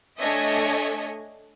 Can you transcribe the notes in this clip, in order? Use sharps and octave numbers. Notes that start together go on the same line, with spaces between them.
A3 D4 C#5 D#5 E5 G#5